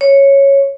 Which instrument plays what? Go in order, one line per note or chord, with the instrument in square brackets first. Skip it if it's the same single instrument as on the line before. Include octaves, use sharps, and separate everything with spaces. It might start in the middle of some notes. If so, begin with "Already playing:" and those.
[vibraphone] C#5